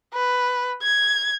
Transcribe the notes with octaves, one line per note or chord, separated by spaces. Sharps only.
B4
G#6